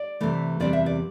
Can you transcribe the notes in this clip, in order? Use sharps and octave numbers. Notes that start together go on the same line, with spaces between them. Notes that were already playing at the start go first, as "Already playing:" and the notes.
Already playing: D5
C3 E3 A3
E2 C3 E3 G3 C4 D5
E5
D5